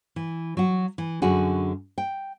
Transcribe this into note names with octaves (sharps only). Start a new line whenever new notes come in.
E3
F#3 F#4
E3
F#2 D3 F#4 G#4
G5